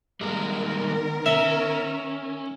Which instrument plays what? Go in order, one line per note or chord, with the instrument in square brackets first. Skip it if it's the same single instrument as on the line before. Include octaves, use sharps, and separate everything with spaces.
[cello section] D#3 B3 A#4 [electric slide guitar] G3 G#3 A#3
[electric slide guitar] C#4 [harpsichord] E5